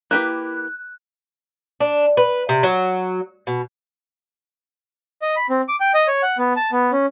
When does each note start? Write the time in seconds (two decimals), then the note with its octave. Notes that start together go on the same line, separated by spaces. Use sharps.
0.11 A#3 E4 G4 B4 F#6
1.80 D4
2.17 B4
2.49 C3
2.63 F#3
3.47 B2
5.22 D#5
5.36 B5
5.50 C4
5.68 D6
5.80 G5
5.94 D#5
6.08 C#5
6.23 F#5
6.38 B3
6.56 A5
6.72 B3
6.92 C#4